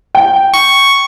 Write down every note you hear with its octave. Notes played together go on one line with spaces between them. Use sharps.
G5
C#6